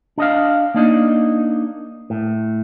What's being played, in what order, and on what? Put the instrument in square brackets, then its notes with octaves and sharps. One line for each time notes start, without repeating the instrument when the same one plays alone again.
[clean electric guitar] D4 D#5 F5
A#3 D4 D#4
A2